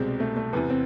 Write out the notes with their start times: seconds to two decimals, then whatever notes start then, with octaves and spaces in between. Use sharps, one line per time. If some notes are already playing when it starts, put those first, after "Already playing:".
Already playing: C2 B2 G3 G#3 C4
0.20 A3
0.37 A3
0.53 E2 C3 E3 B3
0.70 C4